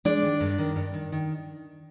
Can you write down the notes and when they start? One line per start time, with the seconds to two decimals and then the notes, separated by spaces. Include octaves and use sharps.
0.05 G#3 D4 D5
0.23 D#3
0.40 G2
0.58 D#3
0.76 G2
0.94 D#3
1.12 D#3